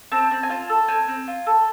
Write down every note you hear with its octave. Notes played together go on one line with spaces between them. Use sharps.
C4 A5
C4
G#5
F4 A5
A4
C4 G#5
C4
F4
A4